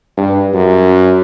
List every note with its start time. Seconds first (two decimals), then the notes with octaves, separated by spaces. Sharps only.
0.17 G2
0.53 F#2